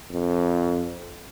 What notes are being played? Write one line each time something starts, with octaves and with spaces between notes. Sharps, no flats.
F2